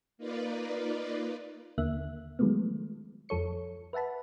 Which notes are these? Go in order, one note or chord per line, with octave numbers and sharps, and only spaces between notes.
A#3 D#4 F4 B4 D5
D#2 D3 A#3 E5 F#6
D#3 F3 F#3 G#3 A3 B3
F2 F3 A4 C#5 C#7
B4 E5 F#5 A5 B5